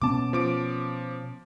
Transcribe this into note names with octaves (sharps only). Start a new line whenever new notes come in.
B2 B3 C#4 A5 D6
F3 D6 D7